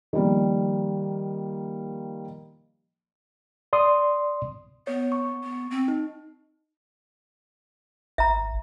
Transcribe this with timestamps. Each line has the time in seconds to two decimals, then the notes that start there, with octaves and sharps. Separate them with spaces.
0.13 D#3 F3 G3 A#3
3.73 D5 C6 D#6
4.87 B3 C#5
5.12 C#6
5.43 B3
5.71 C4
5.88 D#4
8.18 G#1 E5 A#5